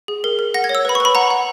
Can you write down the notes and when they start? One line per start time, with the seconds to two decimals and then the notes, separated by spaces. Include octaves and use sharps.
0.08 G#4
0.24 A#4
0.39 A#4
0.54 F#5 A#6
0.64 G#6
0.69 C#5
0.75 E6
0.85 B4 B5
0.95 C#6
1.00 B4 B5
1.15 F#5 A#5
1.30 F#5